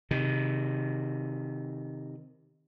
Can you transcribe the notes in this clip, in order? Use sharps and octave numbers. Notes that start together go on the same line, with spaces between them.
C3 D#3